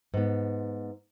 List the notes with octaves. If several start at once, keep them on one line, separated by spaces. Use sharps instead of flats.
G#2 B3